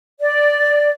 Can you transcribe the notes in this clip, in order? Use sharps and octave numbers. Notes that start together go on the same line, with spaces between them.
D5